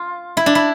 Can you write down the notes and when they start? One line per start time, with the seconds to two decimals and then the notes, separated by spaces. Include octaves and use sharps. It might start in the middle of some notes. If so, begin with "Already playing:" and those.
Already playing: F4
0.37 E4
0.46 D4
0.55 E4